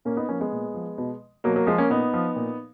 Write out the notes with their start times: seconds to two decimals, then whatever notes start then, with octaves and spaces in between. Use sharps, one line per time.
0.05 A#2 A#3 C#4
0.17 B3 D#4
0.28 F3 A#3 C#4
0.40 G#3 B3
0.52 A#2
0.74 F3
0.98 B2
1.44 B2 F#3 A#3
1.56 F#3 A#3
1.67 F3 G#3
1.78 A#3 C#4
1.90 A#2 B3 D#4
2.13 F3
2.36 A#2